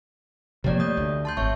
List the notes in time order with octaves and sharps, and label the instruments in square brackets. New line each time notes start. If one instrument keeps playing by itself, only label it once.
[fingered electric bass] C3 F3 A#3 [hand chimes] G4 C#5 D5
[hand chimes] A3 D#6 G6
[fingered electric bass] D2
[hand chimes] A5 C6 G6
[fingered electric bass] G#1 [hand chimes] C#5 E5 C#6